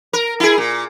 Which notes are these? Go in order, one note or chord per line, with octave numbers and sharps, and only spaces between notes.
A#4
E4 G#4
A#2